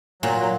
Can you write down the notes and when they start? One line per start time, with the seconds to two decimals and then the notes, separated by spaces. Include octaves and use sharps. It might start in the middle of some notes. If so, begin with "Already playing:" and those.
0.22 A#2 F#3
0.37 F#3